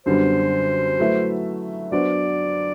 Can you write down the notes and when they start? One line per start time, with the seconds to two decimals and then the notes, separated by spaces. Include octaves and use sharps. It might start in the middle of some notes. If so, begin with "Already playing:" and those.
0.06 F#2 D3 G3 B3 D4 C5
1.00 F#3 A3 E4 B4 E5
1.92 F#3 B3 D4 F#4 C5 D5